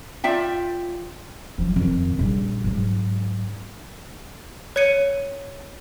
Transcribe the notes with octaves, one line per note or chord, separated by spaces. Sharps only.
F4 D5 E5 G5
F3 F#3
F2 D#3
A#1 G3
G#2 F#3
C#5 G#6 C#7 D#7